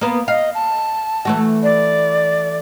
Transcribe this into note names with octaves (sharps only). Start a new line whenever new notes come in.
A#3 B3
D#5 F5
A5
E3 A3 F#4
D5